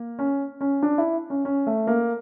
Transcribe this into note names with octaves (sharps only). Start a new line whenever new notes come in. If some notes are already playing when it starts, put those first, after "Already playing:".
Already playing: A#3
C#4
C#4
D4
E4
C#4
C#4
A3
A#3